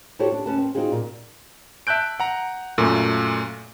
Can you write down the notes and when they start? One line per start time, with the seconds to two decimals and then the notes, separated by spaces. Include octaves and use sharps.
0.19 E4 F#4 G4 A4 C5 C#5
0.32 D4
0.46 D#2 C#4 B4 A5
0.57 C4
0.75 C4 D#4 F4 F#4 G#4
0.92 A#2
1.87 E5 A5 F#6 G6 D7
2.20 F#5 A#5
2.78 F#2 A#2 A3